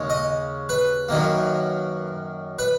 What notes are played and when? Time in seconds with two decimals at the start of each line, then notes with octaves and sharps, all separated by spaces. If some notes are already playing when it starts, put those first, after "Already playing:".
Already playing: D#2 C#3 G#3 C#4
0.10 D#5
0.69 B4
1.09 F#2 D#3 A#3
2.59 B4